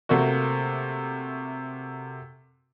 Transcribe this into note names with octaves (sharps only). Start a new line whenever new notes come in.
C3 A3 A#3 F#4